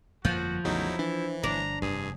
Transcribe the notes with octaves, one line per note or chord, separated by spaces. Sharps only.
G1 F2 F3 A#3 F#4
A1 E2 C#3 F#3 A3 D#4 E4
E3 D4
G1 D4 A#5
F1 G2 G#4